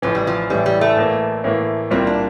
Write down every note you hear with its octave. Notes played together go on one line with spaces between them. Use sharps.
A1 A2 E3 F3
G3
F3
A1 A2 E3 G3
G3
A3
A2 E3 A#3
A2 E3 A#3
C2 A#2 G3 A#3 C4 F4
D4